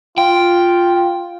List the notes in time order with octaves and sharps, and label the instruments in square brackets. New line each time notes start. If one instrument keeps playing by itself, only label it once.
[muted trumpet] F4 [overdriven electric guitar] G5